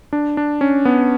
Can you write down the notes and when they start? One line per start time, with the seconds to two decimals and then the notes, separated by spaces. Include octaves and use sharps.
0.13 D4
0.37 D4
0.61 C#4
0.85 B3